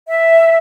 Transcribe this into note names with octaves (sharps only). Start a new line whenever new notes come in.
E5